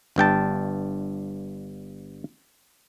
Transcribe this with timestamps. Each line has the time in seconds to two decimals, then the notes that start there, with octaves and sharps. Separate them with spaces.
0.16 G1 G2 G5 A5